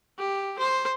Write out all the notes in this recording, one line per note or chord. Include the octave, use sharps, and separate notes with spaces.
G4
C5